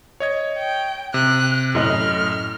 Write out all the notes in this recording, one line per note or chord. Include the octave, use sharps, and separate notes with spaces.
C#5 D#5 G#6
G5
C3 F#6
F#2 A2 D#5 F6 F#7